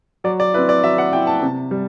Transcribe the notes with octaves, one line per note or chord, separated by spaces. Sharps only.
F#3 D5
D5
C4 E4 B4
D5
F#3 E5
F#5
C4 E4 G5
A5
C3
G3